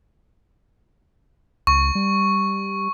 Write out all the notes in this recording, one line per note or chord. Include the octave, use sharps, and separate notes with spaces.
C#2 C#6
G3